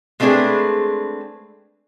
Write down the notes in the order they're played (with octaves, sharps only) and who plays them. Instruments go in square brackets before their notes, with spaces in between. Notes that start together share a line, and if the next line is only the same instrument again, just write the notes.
[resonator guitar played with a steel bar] G#3 A3 C4 D4 G#4 B4